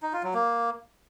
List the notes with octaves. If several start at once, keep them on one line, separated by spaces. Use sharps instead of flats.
D#4
F4
F#3
A#3